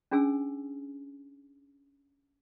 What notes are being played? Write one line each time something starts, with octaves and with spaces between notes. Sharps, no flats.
C#4 D4 G#4 G#5 E6